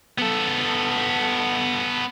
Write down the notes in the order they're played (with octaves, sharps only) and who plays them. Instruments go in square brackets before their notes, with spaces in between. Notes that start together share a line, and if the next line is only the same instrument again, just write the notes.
[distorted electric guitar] B3 A4